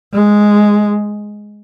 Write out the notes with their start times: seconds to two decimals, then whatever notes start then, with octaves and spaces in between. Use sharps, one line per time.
0.13 G#3